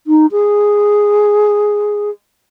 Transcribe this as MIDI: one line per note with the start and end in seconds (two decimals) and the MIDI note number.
0.07 0.26 63
0.32 2.10 68